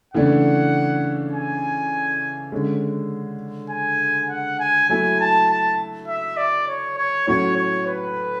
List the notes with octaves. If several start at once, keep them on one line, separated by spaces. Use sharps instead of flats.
C#3 E3 A3 D4 F#5
G#5
D3 G#3 C#4
G#5
F#5
G#5
F#3 A3 E4 G#5
A5
A5
E5
D5
C#5
C#5
A2 F#3 C#4 F#4 C#5
C#5
B4